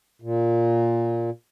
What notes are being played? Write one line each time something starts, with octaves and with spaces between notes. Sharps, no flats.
A#2